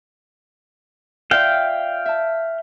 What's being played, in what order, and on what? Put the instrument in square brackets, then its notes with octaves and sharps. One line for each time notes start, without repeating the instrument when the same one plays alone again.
[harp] F4 D5 E5 [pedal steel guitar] F5 G5
[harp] E5 A5